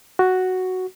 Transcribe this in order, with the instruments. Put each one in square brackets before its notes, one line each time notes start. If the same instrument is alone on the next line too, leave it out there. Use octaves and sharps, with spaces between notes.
[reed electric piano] F#4